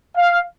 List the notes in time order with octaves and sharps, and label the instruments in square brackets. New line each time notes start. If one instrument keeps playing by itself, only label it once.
[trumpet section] F5